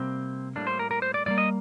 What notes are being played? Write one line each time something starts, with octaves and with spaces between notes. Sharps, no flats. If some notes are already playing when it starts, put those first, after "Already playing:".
Already playing: C3 G3 A#3 C4
A2 G3 A#3 D4
C5
A#4
A#4
C5
D5
A2 G3 A#3 D5
D#5